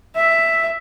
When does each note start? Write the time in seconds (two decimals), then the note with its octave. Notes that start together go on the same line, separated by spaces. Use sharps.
0.16 E5